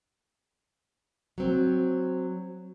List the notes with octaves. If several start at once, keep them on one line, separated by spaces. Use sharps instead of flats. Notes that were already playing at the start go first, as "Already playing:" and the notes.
F#3 C4